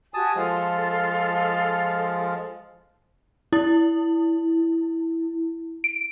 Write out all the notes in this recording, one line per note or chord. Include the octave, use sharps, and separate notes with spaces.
F#4 G4 G#5 A5 D#6
F3 G#3 F4 A4
E4
D7